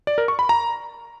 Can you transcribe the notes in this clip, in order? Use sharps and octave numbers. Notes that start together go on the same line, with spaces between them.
D5
A#4
C#6
B5
A#5